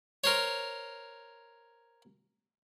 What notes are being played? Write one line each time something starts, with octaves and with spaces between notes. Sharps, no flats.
A#4 C5 C#5